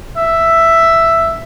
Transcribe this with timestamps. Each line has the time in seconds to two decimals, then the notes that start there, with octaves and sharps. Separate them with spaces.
0.17 E5